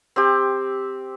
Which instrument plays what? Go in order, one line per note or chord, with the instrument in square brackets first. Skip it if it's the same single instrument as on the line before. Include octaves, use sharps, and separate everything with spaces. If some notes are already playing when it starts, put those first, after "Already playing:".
[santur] C4 G4